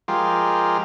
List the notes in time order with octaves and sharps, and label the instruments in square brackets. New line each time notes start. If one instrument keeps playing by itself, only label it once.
[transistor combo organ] F3 G#3 F4 G4 A#4